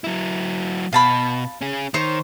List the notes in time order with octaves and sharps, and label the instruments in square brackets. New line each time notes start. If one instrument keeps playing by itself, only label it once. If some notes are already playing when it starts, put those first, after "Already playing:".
[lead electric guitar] F#3 E4
[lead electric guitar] B2 [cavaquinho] F5 A5 B5
[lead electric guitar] C#4 G#4
[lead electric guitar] D#3 [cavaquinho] C5 C#5